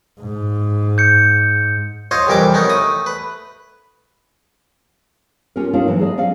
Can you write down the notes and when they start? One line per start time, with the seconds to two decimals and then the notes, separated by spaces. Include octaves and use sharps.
0.20 G#2
0.98 G6 C#7
2.11 F4 C5 C#5 D#5 F5
2.27 C2 F2 E3 A#4 E5 D6
2.54 B3 C#4 D#4 A#4
2.69 A3 D#6
3.06 B4
5.56 C#4 F4 G4 A#4
5.73 D4 D#4 F4 A#4 C#5
5.88 E3 F#3 A3 A#3
5.99 G#4 D5 D#5
6.18 F#3 C#4 D5 F5